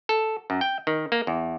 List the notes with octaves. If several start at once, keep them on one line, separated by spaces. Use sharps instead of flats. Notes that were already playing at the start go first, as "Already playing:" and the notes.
A4
F#2
G5
D#3
A#3
E2